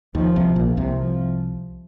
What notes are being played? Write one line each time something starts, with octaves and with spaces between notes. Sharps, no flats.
D#2 D#3 F3
C2 C3
A#1 A#2
C2 C3
F3